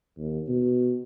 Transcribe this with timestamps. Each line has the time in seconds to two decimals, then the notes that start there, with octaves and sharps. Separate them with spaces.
0.18 D#2
0.48 B2